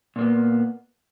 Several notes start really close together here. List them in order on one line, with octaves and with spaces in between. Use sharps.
A#2 A#3 B3